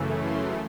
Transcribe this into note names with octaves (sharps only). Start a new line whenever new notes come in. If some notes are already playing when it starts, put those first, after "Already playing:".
Already playing: F#2 C#3 E3 A3
C6